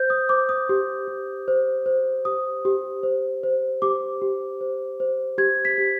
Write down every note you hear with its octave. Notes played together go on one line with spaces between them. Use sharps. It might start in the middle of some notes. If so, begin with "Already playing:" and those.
Already playing: C5 G6
D#6
C5 D6
D#6
G4
G4
C5
C5
G4 D#6
G4
C5
C5
G4 D6
G4
C5
C5
G4 G#6
B6
G4